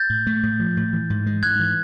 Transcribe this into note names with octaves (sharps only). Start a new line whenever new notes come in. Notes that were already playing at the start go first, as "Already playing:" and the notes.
Already playing: G6 A6
A2
A3
A2
F3
A2
E3
G#2
G#3
G#2 F#6 G#6
E3